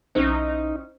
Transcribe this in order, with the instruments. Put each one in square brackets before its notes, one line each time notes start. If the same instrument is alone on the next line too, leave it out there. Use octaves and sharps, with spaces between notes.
[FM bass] B1 [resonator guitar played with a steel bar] C4 C#4 E4 [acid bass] D#4 [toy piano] C5